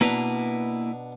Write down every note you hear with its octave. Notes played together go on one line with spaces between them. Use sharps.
B2 A#3 D4 E4 B4 A#5